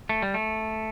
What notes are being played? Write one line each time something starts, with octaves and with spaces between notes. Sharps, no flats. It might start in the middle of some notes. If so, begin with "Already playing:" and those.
A3
G3
A3